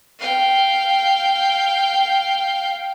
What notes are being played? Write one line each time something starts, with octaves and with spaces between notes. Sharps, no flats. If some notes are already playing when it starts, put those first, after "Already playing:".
F5 G5